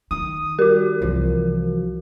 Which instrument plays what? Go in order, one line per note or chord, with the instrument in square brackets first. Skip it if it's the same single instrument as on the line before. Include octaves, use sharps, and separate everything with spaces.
[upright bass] D#3 [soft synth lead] D#6
[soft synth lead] G3 [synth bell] F#4 A#4
[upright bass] C2 E3 [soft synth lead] F3